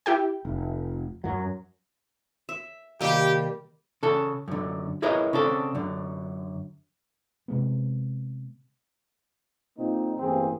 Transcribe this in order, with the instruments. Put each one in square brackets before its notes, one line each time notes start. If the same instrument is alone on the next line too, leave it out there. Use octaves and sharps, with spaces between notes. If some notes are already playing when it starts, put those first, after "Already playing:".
[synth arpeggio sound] E4 G4 G5
[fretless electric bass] F1
F#2 F#3
[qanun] E5
[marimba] C3 D#3 [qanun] G3 A#3 [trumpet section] G4
[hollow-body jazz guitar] C#3 A4
F#2 D3
E4 G#4 A#4 B4 C#5 D#5
C#3 C4 D4 A4
F#2 D3
[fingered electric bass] C3 G#3 B3
[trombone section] A#2 D3 A#3 C4 D#4
A1 G2 E3 A#3 C4 G#4